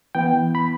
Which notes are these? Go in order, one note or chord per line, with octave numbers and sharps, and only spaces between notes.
E3 B3 G5
B5